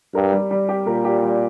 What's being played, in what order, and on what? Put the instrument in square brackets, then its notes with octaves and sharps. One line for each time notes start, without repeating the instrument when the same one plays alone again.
[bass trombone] G2 [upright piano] A#4
[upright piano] G3
G3
G4
[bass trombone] A#2 [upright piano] A#4
[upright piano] G4
G3